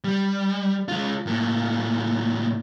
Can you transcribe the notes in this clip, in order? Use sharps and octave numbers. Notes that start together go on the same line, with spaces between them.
G3
G#3 F4
A2 A#3